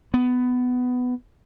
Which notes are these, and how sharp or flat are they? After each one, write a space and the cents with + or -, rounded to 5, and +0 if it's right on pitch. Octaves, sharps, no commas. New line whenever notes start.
B3 +15